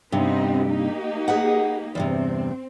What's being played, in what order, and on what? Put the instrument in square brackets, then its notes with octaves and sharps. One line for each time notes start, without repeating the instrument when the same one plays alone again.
[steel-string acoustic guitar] G2 C3 [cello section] B3 C4 D#4
[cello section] A#3 D#4 G4
[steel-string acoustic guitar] G#4 B4 F#5
[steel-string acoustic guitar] E2 G2 C3 [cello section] C4